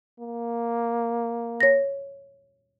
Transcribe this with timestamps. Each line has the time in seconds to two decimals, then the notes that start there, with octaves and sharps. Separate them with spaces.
0.20 A#3
1.61 C#5 A#6